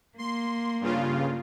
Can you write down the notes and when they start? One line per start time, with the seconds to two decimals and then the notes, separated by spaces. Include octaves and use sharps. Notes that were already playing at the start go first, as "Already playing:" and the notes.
0.18 A#3 C6
0.81 G2 C#3 F4